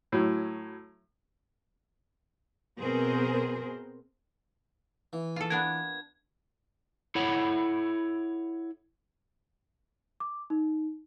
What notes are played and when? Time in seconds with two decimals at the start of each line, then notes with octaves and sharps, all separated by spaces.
0.12 A2 F#3
2.80 B2 B3 C4 G#4 A#4 C5
5.13 E3
5.36 F4 A4
5.50 B3 D4 A#4 G#6
7.15 E4 A4 C#5 F#5 B5
10.20 D6
10.50 D#4